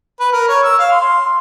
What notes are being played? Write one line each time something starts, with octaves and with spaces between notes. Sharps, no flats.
B4
A#4
C#5
E6
F5
C6